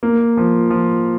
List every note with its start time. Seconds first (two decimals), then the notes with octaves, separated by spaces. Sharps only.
0.03 A#3
0.37 F3
0.70 F3